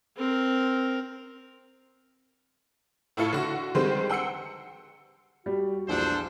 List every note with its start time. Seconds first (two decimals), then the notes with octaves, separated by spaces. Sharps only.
0.17 C4 A#4
3.17 A2 E4 F4 A4 C#7
3.33 D3 F#4
3.75 D3 D#3 G3 G#3 C4 C5
4.09 F#5 G5 E6 C7 C#7
5.46 G3 F#4
5.88 A#1 E2 D4 F4 A4 C5